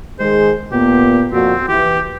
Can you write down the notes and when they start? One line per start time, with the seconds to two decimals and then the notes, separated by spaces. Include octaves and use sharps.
0.19 D#3 G#3 G#4 C5
0.72 A#2 B3 G4
1.32 F2 A#2 C4 F#4
1.68 E3 G4